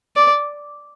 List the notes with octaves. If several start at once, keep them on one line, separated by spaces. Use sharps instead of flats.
D5